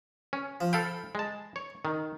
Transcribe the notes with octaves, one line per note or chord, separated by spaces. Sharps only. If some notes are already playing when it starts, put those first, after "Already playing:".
C#4
F3
A4 F5 G5 B5
G#3 A5
C#5
D#3